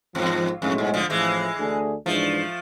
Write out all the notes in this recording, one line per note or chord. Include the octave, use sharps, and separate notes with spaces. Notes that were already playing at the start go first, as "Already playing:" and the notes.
G#1 E2 G#2 F3
B1 F2 A2 G#3
G#2
D3 F3
A1 A2 E3 F3 G#3
D2 D3 A3 D4 G#4
G#2 E3 F3 G#3 A3 D4